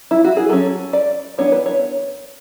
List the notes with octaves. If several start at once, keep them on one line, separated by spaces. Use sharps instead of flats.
E4
F#4
G#4
F#3 C#4 A4
D5
E3 B3 D4 C#5
B4
C#5